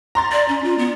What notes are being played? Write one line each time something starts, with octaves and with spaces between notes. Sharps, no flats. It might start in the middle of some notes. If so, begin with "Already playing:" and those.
A#5 C6 A6
D5
C#4
F4
B3